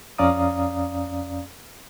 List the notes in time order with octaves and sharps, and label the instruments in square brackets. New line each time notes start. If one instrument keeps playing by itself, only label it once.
[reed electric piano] F2 C#4 D5 F5 A#5 D#6